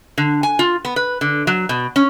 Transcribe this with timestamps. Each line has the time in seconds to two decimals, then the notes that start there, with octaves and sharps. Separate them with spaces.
0.18 D3
0.43 G#5
0.59 F4
0.85 B3
0.96 B4
1.21 D3
1.47 F#3
1.69 B2
1.96 C#4